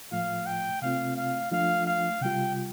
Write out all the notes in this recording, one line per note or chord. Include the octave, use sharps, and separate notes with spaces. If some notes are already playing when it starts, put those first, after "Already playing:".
A2 F3 A3 F4 F5
G5
C3 A3 C4 F4 F5
F5
F3 A3 D4 F4 F5
F5
C3 G3 F4 G5